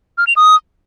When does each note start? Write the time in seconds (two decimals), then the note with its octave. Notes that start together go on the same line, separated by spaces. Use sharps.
0.18 F6
0.27 F7
0.36 D#6